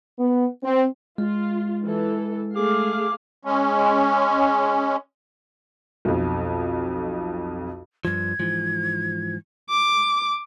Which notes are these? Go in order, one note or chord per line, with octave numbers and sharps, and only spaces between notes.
B3
C4
G#3 F4
E3 A4
A3 G#4 F5 D6
G#3 C#4
B1 F2
G2 F3 G#6
G#2 E3 F3
D6